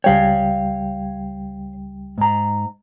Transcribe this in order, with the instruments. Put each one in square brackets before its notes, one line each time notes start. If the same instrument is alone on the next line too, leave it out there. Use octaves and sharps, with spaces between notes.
[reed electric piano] C#2 G3 G5 [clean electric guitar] C#5 F5
[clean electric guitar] G#2 A#5